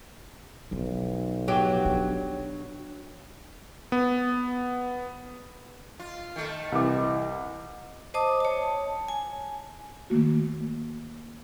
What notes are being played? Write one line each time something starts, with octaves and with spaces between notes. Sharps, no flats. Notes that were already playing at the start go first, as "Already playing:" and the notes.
B1 F3
F#3 G4
D4
B3
F4
D#3 A3
C2 E3 D6
C5 D#5 A5 D6 D#6
C#5 A5
G#5
D#3 A3 A#3 F#4